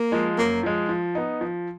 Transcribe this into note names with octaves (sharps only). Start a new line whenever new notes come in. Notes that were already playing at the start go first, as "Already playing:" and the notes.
Already playing: A#3
F3 G#3
F#2 A#3
F3 G#3
F3
B3 D#4
F3